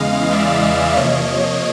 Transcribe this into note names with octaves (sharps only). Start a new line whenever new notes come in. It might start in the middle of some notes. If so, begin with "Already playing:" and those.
Already playing: E2 C#3 E3 G#3 D#5 F5
D5 E5
C3 F3 A#3 C#5 D#5